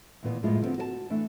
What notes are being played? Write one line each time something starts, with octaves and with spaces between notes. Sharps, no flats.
D#2 A#2 E3 B3
F#2 A2 F3 G#3 A#3 F4
D3 F3 G#3 B3 C4
F#4 B4 A5
E3 A3 D4